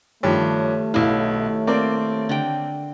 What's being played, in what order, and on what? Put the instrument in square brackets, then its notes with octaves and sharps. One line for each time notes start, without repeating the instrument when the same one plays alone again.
[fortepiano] G2 F3 [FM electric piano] D#3 G4 C#5 [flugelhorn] A3
[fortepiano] B1 F5 [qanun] E4
[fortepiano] A#3 C4 D5
[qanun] D3 G5